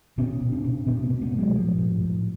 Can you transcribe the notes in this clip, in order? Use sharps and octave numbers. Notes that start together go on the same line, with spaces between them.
B2 B3 C#4
B2
C4 D4
B2
B2 B3 C#4
A#3 C4
B2
A3 B3
B2
F#3 G#3
A2 F3 G3
A2
A2